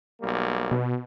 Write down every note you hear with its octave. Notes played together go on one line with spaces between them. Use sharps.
B1 G3 A#3
B2